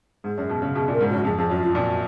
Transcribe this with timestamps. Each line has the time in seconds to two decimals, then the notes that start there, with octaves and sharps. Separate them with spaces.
0.24 G#2 G#4
0.38 F#2
0.49 B2
0.62 C#3
0.75 B2 G#4
0.88 A#2
0.92 A#4
1.00 G#2
1.09 F#2 F#4
1.25 F2 G#4
1.38 F2 G#4
1.50 F#2 F#4
1.63 F4
1.75 A#2 F#4